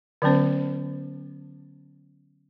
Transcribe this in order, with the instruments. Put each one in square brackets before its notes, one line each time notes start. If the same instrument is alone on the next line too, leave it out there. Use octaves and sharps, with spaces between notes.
[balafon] D3 F#3 B3 C#4 C5